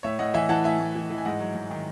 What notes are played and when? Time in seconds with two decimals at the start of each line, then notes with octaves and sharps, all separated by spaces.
0.03 A2 C#5 E5
0.19 A2 D#5 F#5
0.34 E3 E5 G#5
0.49 E3 F#5 A5
0.64 A2 E5 G#5
0.79 A2
0.95 E3
1.10 E3
1.18 G#5
1.25 G#2 D#5 F#5
1.40 F#3
1.55 G#2
1.71 D#3